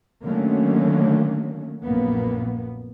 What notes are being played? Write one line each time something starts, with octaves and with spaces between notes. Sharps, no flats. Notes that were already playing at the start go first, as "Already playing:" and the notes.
D3 D#3 F#3 A3 A#3 C#4
A#1 F#2 A#3 B3